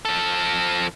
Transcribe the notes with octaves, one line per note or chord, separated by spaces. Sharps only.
F3 A4